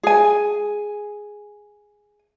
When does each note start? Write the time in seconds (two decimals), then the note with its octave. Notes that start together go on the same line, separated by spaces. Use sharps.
0.03 G#4 G#5